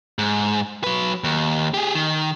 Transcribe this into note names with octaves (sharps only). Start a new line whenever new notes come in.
G#2
F#3 B4
D#2
G4 G#4
D#3